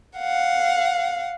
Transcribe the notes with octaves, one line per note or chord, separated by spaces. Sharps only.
F5 F#5